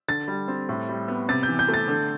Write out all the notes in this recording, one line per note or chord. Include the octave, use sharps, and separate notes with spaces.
D3 A6
G3
C4
A2
G3
B3
C3 A6
G6
E3
G6
A3
A6
D3